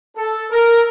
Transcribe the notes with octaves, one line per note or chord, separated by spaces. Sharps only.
A4
A#4